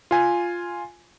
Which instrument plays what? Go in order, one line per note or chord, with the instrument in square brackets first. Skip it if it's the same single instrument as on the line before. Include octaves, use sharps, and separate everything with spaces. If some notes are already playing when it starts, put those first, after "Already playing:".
[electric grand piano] F4 G#5